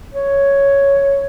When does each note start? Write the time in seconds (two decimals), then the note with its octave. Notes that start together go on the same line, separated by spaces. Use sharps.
0.14 C#5